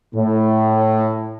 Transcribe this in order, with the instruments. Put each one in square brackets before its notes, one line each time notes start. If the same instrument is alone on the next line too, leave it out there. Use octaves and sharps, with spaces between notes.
[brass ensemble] A2